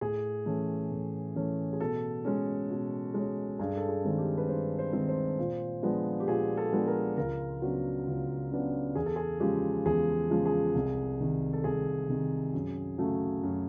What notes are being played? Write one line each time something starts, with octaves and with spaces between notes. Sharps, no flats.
A2 G#4
E3 A3 C#4
A2
E3 A3 C#4
G#4
B2 A4
G#3 C#4
B2
G#3 C#4
G2 G#4
A4
G#4
D#3 G#3 C4
G4
B4
G2 C5
C5
D#3 G#3 C4
C5
A#2
F3 G#3 B3 D4
G4
A#2 G#4
A4
F3 G#3 B3 D4
A#4
C#2 A#4
C#3 F#3 B3 D4
C#2
C#3 F#3 B3 D4
E2 G#4
A4
G#4
C#3 F3 G#3 G4
E2 G#4
C#3 F3 G#3
G#4
C2
C3 D#3
A4
C2 G#4
C3 D#3
F#2
C#3 F#3 A3
F#2